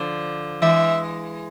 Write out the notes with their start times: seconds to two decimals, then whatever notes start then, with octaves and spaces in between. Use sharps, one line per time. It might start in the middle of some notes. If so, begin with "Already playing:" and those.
Already playing: D3 F3
0.62 E3 G#3 E5